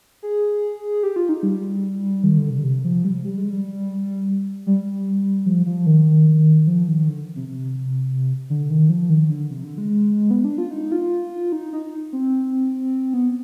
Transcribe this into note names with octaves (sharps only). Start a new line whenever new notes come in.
G#4
G4
F4
D#4
G3
D#3
D3
C3
D3
C3
F3
G3
G3
G#3
G3
G3
F3
F3
D#3
F3
D#3
D3
C3
C3
D3
D#3
F3
D#3
D3
C3
D3
G#3
B3
D4
F4
D#4
F4
D#4
D#4
C4
B3